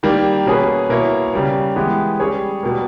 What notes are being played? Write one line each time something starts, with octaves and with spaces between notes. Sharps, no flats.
D#3 G3 A#3
B2 A#3 C#4 G#4 B4
B2 A#3 E4 A#4 C#5
C#3 G3 A#3
E3 G#3 B3 G4
G3 C#4 G#4 C#5
B2 G3 A#3